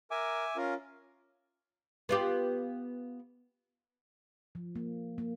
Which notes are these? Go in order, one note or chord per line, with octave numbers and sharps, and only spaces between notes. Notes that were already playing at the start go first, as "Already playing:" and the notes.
A#4 E5 G#5 D6
C#4 F4 A#4
B3 F4 G4
F3
A#3
A#3